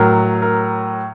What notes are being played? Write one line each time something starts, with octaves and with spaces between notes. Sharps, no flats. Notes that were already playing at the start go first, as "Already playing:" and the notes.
Already playing: A2 F#3 A#4
A#4